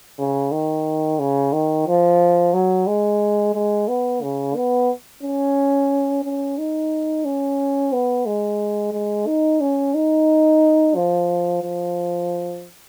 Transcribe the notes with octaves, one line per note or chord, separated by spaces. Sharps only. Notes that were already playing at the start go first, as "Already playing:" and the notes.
C#3
D#3
C#3
D#3
F3
F#3
G#3
G#3
B3
C#3
B3
C#4
C#4
D#4
C#4
B3
G#3
G#3
D#4
C#4
D#4
F3
F3